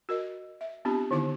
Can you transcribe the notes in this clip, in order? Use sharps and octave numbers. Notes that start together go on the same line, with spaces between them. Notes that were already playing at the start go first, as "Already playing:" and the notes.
F#4 A#4 D#5
E5
B3 C4 D4 F4 G4
D3 D#3 B3 D#4 E4 D6